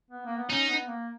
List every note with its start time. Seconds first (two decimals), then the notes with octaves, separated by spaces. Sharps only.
0.11 B3
0.26 A#3
0.37 B3
0.50 C#4 D#4
0.69 B3
0.88 A#3